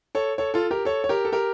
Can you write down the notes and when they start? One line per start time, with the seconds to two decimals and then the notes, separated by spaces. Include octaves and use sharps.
0.15 A4 C#5
0.38 A4 C#5
0.54 F4 A4
0.71 G4 A#4
0.85 A4 C#5
1.04 C#5
1.09 G4 A#4
1.25 A4
1.32 G4 A#4